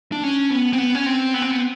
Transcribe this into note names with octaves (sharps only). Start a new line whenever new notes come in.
D4
C#4
B3
C4
B3
C#4
C4
B3
C4
B3